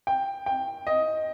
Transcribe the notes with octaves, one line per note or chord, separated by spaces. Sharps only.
G5
G5
D#5